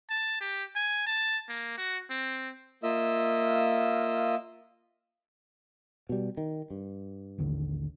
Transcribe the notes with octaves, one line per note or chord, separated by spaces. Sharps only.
A5
G4
G#5
A5
A#3
F#4
C4
A#3 F4 D#5 E5 E6
B2 G3
D#3
G2
A1 D#2 D3